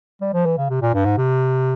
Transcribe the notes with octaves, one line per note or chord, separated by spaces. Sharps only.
G3
F3
E3
C#3
C3
A#2
G2
G#2
C3